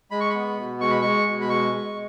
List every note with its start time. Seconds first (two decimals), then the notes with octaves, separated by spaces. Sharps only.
0.11 G#3 B5
0.20 C#6
0.30 B3 B5
0.58 B2
0.80 G#3 C#6
0.91 B5
1.01 G#3 C#6
1.26 B2
1.41 B5
1.49 G#3 C#6
1.71 G#3